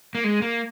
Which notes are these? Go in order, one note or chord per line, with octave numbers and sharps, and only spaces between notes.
A#3
G#3
A#3